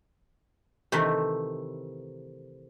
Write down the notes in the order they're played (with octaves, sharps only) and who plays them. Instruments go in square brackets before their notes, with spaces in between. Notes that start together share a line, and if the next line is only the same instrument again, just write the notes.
[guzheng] C3 D#3 E3 A3